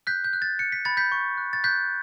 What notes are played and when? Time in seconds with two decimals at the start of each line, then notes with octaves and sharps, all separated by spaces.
0.07 F#6 G6 B6
0.24 G6
0.33 F#6
0.42 A6
0.59 F#6 C#7
0.72 B6
0.85 B5 A6
0.97 G6 B6
1.12 C#6
1.37 F#6
1.53 A6
1.64 F#6 G6 B6